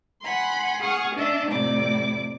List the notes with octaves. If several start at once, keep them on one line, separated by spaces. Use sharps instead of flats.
F#5 G#5 B5 C6
G#4 F#5 C#6 D#6 F6 G#6
C#4 D4 D#5 E5
F2 A2 C3 D5 D6